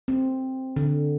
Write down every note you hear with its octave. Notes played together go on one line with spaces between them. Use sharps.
C4
D3